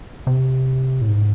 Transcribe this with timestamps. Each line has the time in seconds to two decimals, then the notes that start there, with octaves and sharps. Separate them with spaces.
0.27 C3
1.01 A2
1.07 G#2